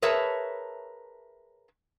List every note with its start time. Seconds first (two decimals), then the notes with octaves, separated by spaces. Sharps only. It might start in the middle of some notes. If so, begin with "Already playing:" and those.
0.02 G#4 A#4 B4 C#5 E5 A5